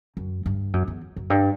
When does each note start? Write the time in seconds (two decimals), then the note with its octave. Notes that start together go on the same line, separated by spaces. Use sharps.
0.17 F#2
0.46 G2
0.73 F#2
0.88 E2
1.16 F#2
1.30 G2